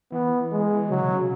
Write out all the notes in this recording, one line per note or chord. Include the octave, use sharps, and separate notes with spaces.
E3 B3
G#3
C#3 F#3
B2
C#3